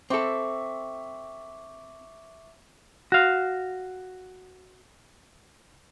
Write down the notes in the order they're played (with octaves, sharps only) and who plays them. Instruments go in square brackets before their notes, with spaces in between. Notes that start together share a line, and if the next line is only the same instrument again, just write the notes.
[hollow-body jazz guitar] C4 A4 [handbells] E5 C#6 D6
[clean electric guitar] F#4 F5